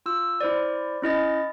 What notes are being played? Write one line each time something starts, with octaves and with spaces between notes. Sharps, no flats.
F4 E6
E4 C5 D5
C#4 E4 D#5 A6